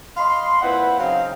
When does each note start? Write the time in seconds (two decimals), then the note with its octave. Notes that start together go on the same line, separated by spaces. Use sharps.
0.17 D#5 F5 B5 C6
0.62 A#2 C4 E4 B4 F#5 B5
0.99 C#3 F#3 C4 D#4 F5 G5